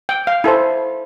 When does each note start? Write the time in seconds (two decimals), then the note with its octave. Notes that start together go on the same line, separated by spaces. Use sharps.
0.09 G5
0.27 F5
0.44 E4 A4 C5